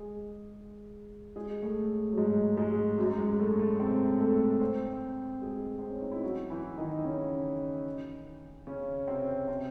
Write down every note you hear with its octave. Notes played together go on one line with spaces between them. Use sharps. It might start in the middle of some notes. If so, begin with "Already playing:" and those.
Already playing: G#3 G#4
G#3 G#4
A2 A3
F#3
G#2 G#3
G#2 G#3
F#2 F#3
G#2 G#3
A2 A3
A2 A3
C3 C4
A3 A4
C4 C5
G#3 G#4
C4
C#4
D#4
E4
F#3 F#4
E3 E4
D#3 D#4
C#3 C#4
C#3 C#4
C3 C4
C3 C4